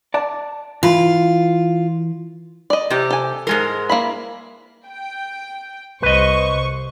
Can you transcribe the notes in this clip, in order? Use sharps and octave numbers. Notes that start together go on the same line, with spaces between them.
D5 A5
E3 E4 F4 B5
D5 D#5
C3 G4
A4 G#5
G#2 G#3 A#4
A#3 E4 B5
G5
C2 B4 C5 D#5 C#6